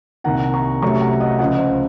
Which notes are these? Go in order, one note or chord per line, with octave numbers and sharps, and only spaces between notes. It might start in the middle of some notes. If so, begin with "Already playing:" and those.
C2 C3 D#3 A#3 F#5 A#5
A#5 C#6
C2 C3 F#3 A3 C#4 A#5 C#6
F#5 A#5
D#5 F#5
C#2 C#3 F3 D#5 F#5
C5 D#5